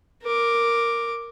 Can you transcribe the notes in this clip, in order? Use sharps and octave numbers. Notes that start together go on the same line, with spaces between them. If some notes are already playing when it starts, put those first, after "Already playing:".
A#4 D6